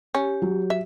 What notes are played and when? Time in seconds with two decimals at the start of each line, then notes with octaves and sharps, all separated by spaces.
0.15 C#4 G4
0.42 F#3
0.70 E5